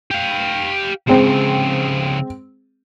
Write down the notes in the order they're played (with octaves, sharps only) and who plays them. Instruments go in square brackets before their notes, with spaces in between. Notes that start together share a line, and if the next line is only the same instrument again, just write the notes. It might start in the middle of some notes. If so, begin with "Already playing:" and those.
[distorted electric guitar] G4 F5
[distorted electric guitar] C#3 F3 [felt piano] G#3 C4